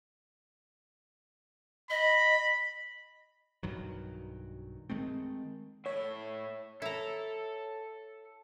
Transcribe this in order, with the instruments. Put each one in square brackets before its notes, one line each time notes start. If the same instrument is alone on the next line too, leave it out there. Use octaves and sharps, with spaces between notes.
[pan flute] D#5 [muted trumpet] B5
[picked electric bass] B1 G2 D#3 F#3
D#3 G#3 A3 C4
[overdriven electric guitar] A2 E5 [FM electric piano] C#5
[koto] E4 A#5 [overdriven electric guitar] A4